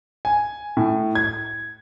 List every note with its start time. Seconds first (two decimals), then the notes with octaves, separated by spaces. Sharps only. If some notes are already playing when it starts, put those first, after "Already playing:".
0.25 G#5
0.77 A2
1.15 G#6